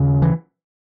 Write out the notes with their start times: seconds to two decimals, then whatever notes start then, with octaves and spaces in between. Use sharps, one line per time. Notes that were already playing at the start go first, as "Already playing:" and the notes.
Already playing: D#2 C#3
0.22 E3